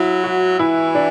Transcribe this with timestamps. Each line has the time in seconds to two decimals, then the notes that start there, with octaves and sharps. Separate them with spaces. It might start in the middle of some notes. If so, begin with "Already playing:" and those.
Already playing: F#3 E4
0.24 F#4
0.59 E3 E4
0.95 D4